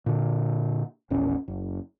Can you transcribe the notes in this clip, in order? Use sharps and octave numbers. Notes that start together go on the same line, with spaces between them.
A#2 D3
E1 A#1 C#4
F#1